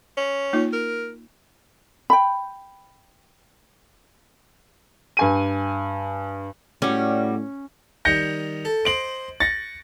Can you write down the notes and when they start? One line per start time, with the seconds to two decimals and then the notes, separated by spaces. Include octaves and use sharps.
0.17 C#4
0.53 A#3 D#4 F4
0.73 A#4
2.10 G5 B5
5.17 G2 G#5 D#7
6.82 A2 G3 C#4 F#4
8.05 D#3 G3 D#4 G6 A#6 C#7
8.65 A4 A5
8.85 C5 D#5 C6 D7 F#7
9.40 C#6 A6 A#6